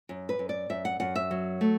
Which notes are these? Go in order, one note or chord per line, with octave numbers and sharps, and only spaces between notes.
F#2
B4
F#2
D5
F#2 E5
F#5
F#2 F#5
E5
F#3
A3